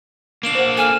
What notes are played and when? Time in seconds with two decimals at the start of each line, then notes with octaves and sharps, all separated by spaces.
0.43 A#3 D4 D7 E7 F#7
0.55 C5 F#5
0.77 A4 G#5 F6 E7